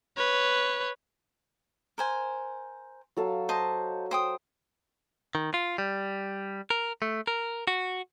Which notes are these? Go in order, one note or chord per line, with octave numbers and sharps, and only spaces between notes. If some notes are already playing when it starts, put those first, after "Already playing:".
B4 C#5
A#4 C5 G#5
F#3 A4 F5
C5 D#5 A5
C5 G5 D#6
D#3
F4
G3
A#4
A3
A#4
F#4